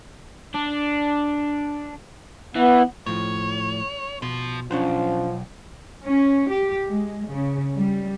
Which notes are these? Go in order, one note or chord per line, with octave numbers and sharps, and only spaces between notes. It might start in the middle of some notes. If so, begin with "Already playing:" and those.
D4
E3 B3
A2 F3 C#5
B2 F3
B1 F3 C#4 D4 C5
C#4
G4
G#3
C#3
G3